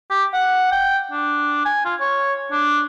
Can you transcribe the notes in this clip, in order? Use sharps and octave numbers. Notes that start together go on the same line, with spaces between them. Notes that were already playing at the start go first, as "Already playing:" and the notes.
G4
F#5
G5
D4
G#5
F4
C#5
D4